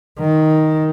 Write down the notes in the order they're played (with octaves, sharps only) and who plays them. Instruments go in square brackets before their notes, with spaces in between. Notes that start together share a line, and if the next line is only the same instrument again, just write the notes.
[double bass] D#3